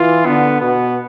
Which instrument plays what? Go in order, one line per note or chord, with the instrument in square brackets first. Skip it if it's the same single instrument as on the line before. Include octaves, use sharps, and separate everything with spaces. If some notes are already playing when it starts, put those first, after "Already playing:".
Already playing: [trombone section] E3 [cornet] F4
[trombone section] D3 [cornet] B3
[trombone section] B2 [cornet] B3